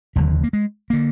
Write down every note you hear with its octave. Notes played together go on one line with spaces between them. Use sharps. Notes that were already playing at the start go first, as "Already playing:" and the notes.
F1 D#2 D3 G3
A#3
G#3
D3 A#3